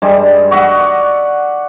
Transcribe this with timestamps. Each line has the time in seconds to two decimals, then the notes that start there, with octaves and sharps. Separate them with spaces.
0.02 G2 G3 G#3
0.51 F#4 D#5 E5 F#5
0.80 D5